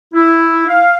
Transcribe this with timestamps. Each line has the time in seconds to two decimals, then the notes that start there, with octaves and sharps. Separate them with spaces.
0.14 E4
0.67 F5